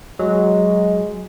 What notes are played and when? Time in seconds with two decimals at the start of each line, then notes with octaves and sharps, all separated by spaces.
0.19 F#3 G#3